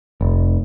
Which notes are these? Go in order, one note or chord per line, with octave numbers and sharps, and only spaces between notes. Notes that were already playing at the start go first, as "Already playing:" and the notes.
F1